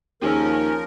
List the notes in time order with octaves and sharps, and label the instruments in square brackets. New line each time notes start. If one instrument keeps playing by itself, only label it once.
[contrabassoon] D#2 [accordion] F3 A#4 [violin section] C#4 [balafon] G4 G#4